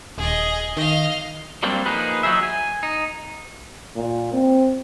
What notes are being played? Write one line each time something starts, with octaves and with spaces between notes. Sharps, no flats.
D#1 G#4 D#5
D#3 D#5 F5
F#3 G3 A#3 C4 D4
F3 A#3 D#4 G#4 B4
F#3 D#4 G#4 E5
G#5
D#4
A#2
C4